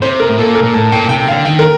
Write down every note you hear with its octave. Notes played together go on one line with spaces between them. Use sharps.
C3 C5
A#4
A2
A#2 A4
A#4
A#2
A2 A5
A#2 G5
C3 G5
D3 F5
D#3 G5
A#4